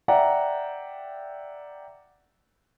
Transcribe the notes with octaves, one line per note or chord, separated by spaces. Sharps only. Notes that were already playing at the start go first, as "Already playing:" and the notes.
D5 E5 F#5 G5 A#5